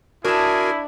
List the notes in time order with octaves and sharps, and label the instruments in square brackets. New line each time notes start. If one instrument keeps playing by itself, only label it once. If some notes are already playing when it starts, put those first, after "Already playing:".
[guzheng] D4 E5 [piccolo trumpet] E4 [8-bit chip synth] F#4 A#4 [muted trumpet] G#4